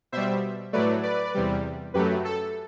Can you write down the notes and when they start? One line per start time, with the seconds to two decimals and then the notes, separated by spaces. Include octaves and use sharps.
0.12 B2 G3 C5 E5
0.73 A2 F#3 A3 B4 D5
1.03 B4 D5
1.35 E2 C3 G3
1.94 F#2 F#3 A3 G4 B4
2.25 A4